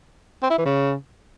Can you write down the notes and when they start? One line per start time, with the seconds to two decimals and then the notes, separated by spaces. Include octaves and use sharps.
0.43 C4
0.51 E4
0.58 E3
0.66 C#3